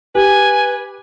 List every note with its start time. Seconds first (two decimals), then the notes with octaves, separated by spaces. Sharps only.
0.15 G4 B4 G#5